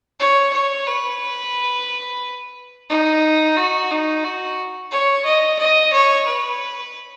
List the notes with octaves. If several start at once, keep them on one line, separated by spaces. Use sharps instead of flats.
C#5
C#5
B4
D#4
F#4
D#4
F#4
C#5
D#5
D#5
C#5
B4